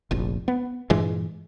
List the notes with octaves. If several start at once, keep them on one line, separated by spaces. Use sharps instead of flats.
F1 A#1
B3
G2 A#2 E3 G#3